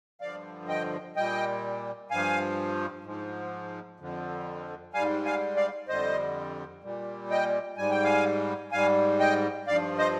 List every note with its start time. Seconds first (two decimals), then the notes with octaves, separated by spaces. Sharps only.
0.21 G2 D3 F3 D5 F5
0.68 D#5 G5
1.16 A#2 G3 D#5 G5
2.11 G2 F3 F5 G#5
3.04 G#2 F3
4.00 F2 D3 F3
4.94 G#2 G3 F5 G#5
5.25 F5 G#5
5.56 D5 F5
5.88 F2 D3 G3 C5 D#5
6.83 A#2 G3
7.30 D#5 G5
7.78 G#2 G3 G#5
7.91 G5
8.04 F5 G#5
8.72 G#2 G3 F5 G#5
9.20 D#5 G5
9.67 G2 F3 D5 F5
9.98 C5 D#5